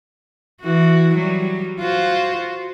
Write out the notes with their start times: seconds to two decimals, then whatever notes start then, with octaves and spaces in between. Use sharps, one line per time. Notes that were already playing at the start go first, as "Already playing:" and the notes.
0.62 E3 F#4
1.14 F#3 G3
1.79 F4 F#4 C5